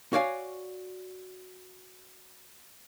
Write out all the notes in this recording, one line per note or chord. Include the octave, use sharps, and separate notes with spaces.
F#4 C#5 D5 F5 F#5 G#5